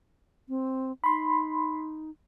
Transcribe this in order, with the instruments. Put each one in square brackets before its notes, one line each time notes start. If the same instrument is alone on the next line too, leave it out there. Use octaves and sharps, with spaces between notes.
[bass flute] C4
[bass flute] D#4 [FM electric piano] B5 C6